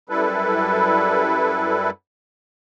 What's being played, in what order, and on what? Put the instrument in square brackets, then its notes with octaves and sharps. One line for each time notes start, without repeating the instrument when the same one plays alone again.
[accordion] F#2 G3 E4 A4 B4